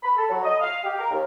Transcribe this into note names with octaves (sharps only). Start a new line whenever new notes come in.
B5
A4
F#3
D#5
F5
G4
A#4
D#2